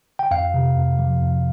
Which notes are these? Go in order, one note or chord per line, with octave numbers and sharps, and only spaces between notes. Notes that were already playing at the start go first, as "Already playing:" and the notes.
G5
F2 F5
C3
F2
F3
F2